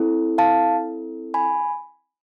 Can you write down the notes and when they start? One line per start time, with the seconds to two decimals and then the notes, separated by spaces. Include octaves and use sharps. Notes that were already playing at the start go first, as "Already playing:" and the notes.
Already playing: C4 E4 A4
0.38 F5 A5
1.34 G#5 B5